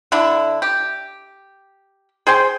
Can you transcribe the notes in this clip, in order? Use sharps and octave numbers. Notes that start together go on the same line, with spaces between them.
D3 D4 E4
G4
G#4 C5 G5 C6